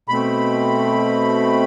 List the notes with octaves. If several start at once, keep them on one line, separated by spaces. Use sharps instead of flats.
B2 A3 C4 B5